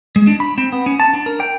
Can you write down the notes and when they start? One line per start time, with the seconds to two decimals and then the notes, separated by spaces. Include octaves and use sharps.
0.16 G#3
0.27 D4
0.40 B5
0.58 C4
0.72 B3
0.86 C#4
1.00 A5
1.14 D4
1.26 A#4
1.40 G5